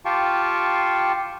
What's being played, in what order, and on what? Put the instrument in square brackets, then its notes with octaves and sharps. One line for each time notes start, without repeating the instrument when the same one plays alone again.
[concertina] F4 G4 F5 G5 A5 C#6